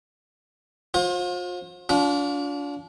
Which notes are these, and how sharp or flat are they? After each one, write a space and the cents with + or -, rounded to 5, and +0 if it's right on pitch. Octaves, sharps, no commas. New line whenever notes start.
F4 +40 C5 +35
D4 -35 F4 +30